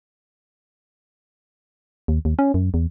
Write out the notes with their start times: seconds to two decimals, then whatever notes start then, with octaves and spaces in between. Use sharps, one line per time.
2.08 D#2
2.25 D#2
2.39 C#4
2.54 F#2
2.74 E2